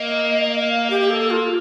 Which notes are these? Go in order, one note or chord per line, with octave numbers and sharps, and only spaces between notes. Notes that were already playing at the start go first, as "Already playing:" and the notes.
Already playing: A#3 D#5
F5
G4
G4
A4
F4